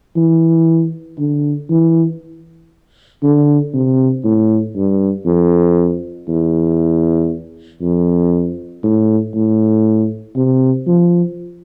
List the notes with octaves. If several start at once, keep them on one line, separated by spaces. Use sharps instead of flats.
E3
D3
E3
D3
C3
A2
G2
F2
E2
F2
A2
A2
C3
F3